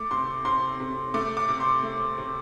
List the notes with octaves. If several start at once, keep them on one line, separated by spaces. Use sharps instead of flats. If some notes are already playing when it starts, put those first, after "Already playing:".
Already playing: A3 D6
C3 C6
C3 C6
C3
A3 D6
D6
C3
C6
A3
C3